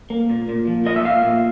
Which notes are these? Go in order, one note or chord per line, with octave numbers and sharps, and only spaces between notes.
A#3
A#2
A#2
F3
A#3 D#5
E5
A#2 F5
A#2